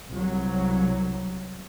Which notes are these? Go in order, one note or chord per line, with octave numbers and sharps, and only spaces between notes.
C2 F#3